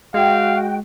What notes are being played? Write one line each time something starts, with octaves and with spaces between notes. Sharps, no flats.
G#3 F#4 F5 G5